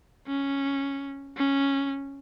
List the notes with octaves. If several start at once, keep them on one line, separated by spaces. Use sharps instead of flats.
C#4
C#4